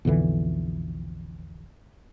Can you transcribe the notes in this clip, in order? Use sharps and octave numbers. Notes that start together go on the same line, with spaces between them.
B1 F2 D3 E3